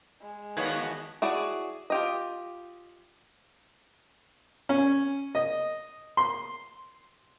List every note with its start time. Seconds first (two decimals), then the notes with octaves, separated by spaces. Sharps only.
0.21 G#3
0.57 D#2 D#3 B3 F#4 B4 C#5 F5 G#6
1.22 E4 F#4 G#4 C#5 D5
1.90 F4 G4 D#5
4.69 C#4
5.35 D#5
6.17 C6